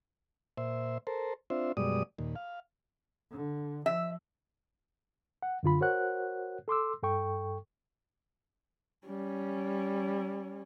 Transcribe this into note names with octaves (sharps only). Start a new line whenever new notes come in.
A#2 C5 E5
A4 A#4 C5
C4 D4 F4 C5 E5
F#2 B2 G3 G#3 D5 D#6
D#2 A#2
F5
D3
F3 E5
F#5
F#2 D3 F4 B5
F#4 A#4 C5 C#5 F#5 F#6
A4 C6 D6 E6
G2 A4 G5 C#6
G3 C#4